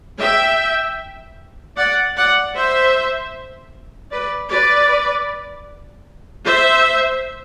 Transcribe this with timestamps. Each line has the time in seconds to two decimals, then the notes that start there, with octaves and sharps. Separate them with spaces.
0.21 E5 G5
1.77 D5 F#5
2.17 D5 F#5
2.56 C5 E5
4.12 B4 D5
4.51 B4 D5
6.46 C5 E5